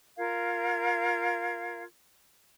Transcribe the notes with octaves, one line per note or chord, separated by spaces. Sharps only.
F4 A#4 F5 G#6